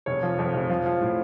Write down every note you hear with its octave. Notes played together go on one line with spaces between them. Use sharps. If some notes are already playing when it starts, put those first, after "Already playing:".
F1 C#5
F3
F2
F1
F3
F3
A2